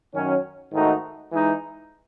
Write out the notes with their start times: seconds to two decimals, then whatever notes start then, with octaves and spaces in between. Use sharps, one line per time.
0.14 F#2 D#3 F#3 C#4
0.73 G#2 D#3 A3 D#4 F#4
1.32 E3 G#3 D#4